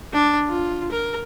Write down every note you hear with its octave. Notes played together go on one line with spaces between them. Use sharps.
D4
F4
A#4